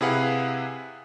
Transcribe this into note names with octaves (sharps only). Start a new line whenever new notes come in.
C3 E4 G#4 B4 F5 F#5